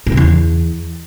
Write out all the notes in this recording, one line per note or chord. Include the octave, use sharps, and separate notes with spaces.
A2
C#3
E2